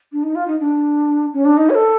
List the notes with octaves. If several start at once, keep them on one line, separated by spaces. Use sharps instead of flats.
D4
D#4
F4
D#4
D4
C#4
D4
D#4
C#5
A4